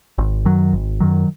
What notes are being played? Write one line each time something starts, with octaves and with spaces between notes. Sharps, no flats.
G#1
F#2 D#3 F#3
G#1
F#2 D#3 F#3